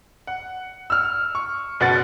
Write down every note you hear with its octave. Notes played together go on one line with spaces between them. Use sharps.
F#5
E6 F6
C#6
F#1 B2 B3 F#5 A6